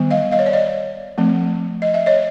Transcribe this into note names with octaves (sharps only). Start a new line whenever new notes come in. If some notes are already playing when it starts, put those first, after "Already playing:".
Already playing: D#3 G3 B3
D#5 F5
D#5 F5
C#5
D5
C#5 D#5
F3 A3 C4
D#5
E5
C#5 D#5